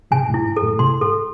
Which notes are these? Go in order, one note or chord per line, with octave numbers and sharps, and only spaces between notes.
G#2 C3 G#5
C3
F#2 A2
E4
G#2
A4
F#2 A2
A2
G#2 C3 C6
G#2 A4